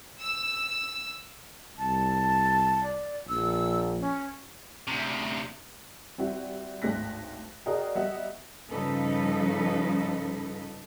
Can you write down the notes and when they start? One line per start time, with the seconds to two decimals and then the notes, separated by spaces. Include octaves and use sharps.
0.21 E6
1.78 C2 A5
2.84 D5
3.29 A#1 E6
4.00 C#4
4.88 D2 C3
6.18 G3 C4 E4 F#4
6.82 G#1 D2 A2 F#6 A#6 B6
7.66 F#4 G#4 A#4 D5 D#5 G5
7.95 F#3 G3 B3 D#5 E5 F#5
8.70 G2 C#3 F3 D#4 A4 B4